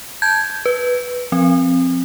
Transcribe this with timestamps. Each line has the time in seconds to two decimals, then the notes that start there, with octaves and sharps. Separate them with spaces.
0.22 A5 G6 G#6
0.66 B4
1.32 F3 C4